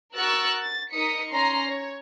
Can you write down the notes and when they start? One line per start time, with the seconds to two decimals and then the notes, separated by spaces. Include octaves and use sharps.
0.16 F#4 A#4 C#6 E6 F#6 A6
0.60 A6
0.93 D#4 A#4 D#6 B6 C#7
1.31 C#4 A#5 C6 C7
1.67 C#5